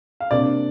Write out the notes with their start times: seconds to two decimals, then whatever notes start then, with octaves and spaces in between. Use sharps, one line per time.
0.20 F5
0.31 C3 A#3 D4 D5